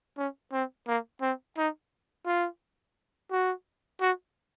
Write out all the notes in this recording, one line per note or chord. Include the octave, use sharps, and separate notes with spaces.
C#4
C4
A#3
C4
D#4
F4
F#4
F#4